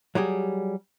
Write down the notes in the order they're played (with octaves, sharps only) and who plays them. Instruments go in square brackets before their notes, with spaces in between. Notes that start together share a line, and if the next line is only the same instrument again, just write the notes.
[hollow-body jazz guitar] F#3 G3 G4 G#4